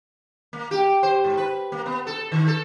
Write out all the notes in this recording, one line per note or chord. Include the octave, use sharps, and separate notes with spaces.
A#3
G4
C5
G#2
B4
A#3
B3
A4
D#3
A4